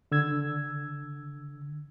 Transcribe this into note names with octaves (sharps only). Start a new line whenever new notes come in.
D3 E6 G#6